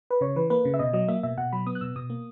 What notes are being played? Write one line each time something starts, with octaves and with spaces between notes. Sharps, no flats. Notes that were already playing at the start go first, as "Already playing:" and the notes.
B4
C#3 C#5
E3 B4
A#3 B4
C#3
E5
B2 D#5
F#3 D#5
A#3 E5
B2 E5
B2 F#5
F#3 B5
B3 D#6
F#6
B2 E6
B2 D#6
A#3